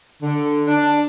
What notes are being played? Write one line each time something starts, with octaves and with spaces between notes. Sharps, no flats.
D3
D4